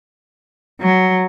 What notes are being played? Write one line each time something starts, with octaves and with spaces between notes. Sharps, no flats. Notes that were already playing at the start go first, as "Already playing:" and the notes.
F#3